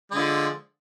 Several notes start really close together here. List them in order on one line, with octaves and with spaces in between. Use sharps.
G#3 D3 F3